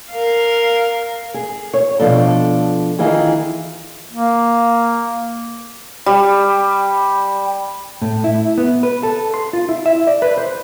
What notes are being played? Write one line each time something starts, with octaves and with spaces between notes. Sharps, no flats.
A#4 F5
G#4
C#5
B2 F3 D4 A4
D#3 E3 D#4 F4 G#4
A#3
G3
A2
E4
B3
B4
A4
C6
F4
E4
E5
D5
B4
C5